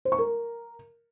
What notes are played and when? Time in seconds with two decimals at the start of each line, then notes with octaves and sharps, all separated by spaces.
0.05 C5
0.12 C#6
0.19 A#4